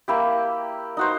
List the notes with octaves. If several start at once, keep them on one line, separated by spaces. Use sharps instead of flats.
A#3 E4 G4
D#4 F#4 C5